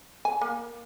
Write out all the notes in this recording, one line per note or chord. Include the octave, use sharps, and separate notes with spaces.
G#5
A#3